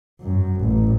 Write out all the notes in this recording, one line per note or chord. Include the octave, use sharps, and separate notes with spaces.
F#2
A1